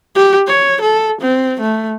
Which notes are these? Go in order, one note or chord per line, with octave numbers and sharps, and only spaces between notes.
G4
C#5
A4
C4
A3